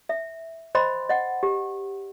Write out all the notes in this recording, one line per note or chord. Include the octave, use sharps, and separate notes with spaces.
E5
C5 D#5 G5 B5 C6
D#5 F#5
G4